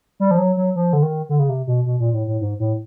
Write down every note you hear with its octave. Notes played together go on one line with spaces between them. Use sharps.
G3
F3
F#3
F#3
F3
D3
D#3
D3
C#3
C3
B2
B2
A#2
A2
A2
G#2
A2